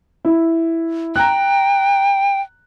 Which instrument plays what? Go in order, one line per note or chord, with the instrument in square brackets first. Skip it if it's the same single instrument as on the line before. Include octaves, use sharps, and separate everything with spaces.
[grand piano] E4
[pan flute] G5 [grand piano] A#5 F#6